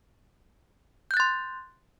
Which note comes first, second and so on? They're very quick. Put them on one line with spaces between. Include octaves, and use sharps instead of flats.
G6 F#6 A6 C6